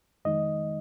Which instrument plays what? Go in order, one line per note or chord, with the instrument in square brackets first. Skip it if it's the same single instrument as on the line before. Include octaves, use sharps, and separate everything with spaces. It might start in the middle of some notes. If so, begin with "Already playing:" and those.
[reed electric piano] F2 D#3 G#3 D#4 D#5